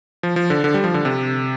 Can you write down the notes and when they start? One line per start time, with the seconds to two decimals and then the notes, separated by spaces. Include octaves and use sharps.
0.23 F3
0.36 F3
0.50 D3
0.64 D3
0.74 G3
0.84 F3
0.94 D3
1.05 C3